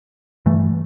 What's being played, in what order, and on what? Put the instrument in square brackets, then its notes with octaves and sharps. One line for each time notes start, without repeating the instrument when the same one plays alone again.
[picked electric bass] G2 E3 A3